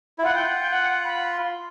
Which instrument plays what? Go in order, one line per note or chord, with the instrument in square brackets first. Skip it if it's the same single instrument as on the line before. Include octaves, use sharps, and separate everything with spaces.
[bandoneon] E4
[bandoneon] F4 [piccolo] F#5
[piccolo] G5
F#5
G5
F#5
B5
C6